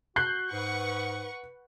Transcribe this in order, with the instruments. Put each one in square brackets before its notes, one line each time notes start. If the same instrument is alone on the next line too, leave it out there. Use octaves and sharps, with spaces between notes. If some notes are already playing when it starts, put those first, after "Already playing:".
[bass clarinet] F#4 [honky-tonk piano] F#6 G6 C7
[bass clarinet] G#2 [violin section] B4 F#5 C#6